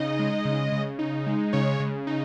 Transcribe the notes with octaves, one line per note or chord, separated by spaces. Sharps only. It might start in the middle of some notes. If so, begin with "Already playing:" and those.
Already playing: C#3 D#4 D#5
G#3
C#3
C#3
D#4
G#3
C#3 C#5
C#3
D#4